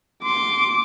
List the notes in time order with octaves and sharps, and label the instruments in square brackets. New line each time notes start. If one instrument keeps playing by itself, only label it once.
[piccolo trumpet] C6 [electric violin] D6